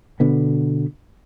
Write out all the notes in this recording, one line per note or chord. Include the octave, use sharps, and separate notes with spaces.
B2 D3 B3